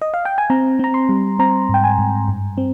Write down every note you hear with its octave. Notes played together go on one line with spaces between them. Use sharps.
D#5
F5
G5
G#5
C4 A#5
C4 A#5
C6
G3
C4 A#5
G#2 G5
G#5
G#2
G2
C4